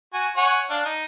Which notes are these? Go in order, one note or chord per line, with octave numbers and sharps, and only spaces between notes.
F#4 G#5
C#5 F#5 G#5
D4 F5
D#4